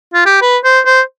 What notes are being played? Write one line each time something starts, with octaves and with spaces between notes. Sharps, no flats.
F4
G4
B4
C5
C5